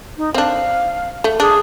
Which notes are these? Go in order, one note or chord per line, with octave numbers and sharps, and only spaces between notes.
D#4
C4 D4 F5
A3
D4 G#4